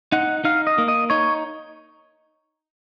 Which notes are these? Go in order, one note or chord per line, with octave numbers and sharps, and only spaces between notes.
D#4 F#5
D#4 F5
D#5
A#3
D#5
D#4 C#5